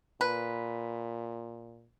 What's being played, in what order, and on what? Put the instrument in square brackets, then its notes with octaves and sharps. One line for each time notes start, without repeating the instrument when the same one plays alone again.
[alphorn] A#2 [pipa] B4